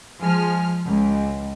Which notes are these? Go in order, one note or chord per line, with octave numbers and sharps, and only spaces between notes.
F3 G#3 G#5 F6
C#2